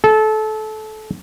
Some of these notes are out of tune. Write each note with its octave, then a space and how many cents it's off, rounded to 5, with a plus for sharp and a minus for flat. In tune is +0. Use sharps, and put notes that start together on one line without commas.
A4 -25